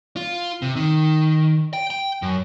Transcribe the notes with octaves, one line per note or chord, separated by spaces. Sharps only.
F4
C3
D#3
G5
G5
F#2